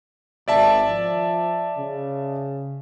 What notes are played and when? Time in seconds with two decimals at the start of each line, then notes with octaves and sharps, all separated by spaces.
0.48 G#1 D5 E5 A5
0.89 F3
1.78 C#3